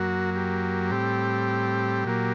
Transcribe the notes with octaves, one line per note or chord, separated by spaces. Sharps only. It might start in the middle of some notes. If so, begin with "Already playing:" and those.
Already playing: F#2 F#3 A#3 F#4
G4
A2 G3 C4
A#2 F#3 A#3